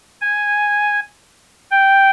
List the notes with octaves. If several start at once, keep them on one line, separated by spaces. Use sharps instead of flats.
G#5
G5